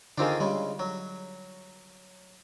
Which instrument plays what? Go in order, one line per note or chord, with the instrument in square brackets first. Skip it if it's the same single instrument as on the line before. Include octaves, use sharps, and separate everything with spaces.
[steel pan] D3 F4 G#4 [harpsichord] D#3 C4 D4
[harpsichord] C#3 G#3 [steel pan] G3
[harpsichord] F#3